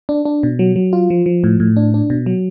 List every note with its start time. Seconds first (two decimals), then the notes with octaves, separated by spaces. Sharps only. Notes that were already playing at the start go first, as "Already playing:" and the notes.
0.09 D4
0.25 D4
0.43 B2
0.59 F#3
0.76 F#3
0.93 F4
1.10 F3
1.26 F3
1.44 A2
1.60 A2
1.76 D4
1.94 D4
2.10 B2
2.26 F#3